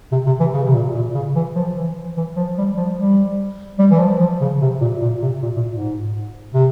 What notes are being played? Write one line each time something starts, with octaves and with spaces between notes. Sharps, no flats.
C3
C3
E3
C#3
C3
A#2
A#2
C#3
E3
F3
E3
E3
F3
G3
F3
G3
G3
E3
F3
F3
C#3
C3
A#2
A#2
C3
A#2
A#2
G#2
C3